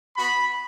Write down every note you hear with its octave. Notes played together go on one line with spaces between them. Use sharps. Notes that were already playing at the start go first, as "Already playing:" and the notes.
B3 F#4 B5